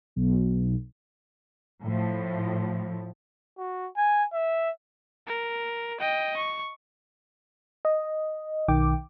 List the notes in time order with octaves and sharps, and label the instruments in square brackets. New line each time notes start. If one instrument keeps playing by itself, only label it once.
[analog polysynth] B1
[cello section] A2 F3
[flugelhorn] F#4
G#5
E5
[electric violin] A#4
D#5 G5
C#6
[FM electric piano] D#5
B1 D#3 G5 D6